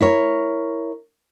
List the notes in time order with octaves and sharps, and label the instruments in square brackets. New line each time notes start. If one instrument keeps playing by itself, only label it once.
[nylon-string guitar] E4 A#4 C#5